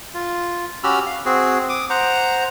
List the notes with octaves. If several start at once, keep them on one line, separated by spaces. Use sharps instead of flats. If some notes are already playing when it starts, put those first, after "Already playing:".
F4
C#4 F#4 G4 B5 E6 F6
F5
C4 F#4 G#4
D6 D#6
C5 F#5 A#5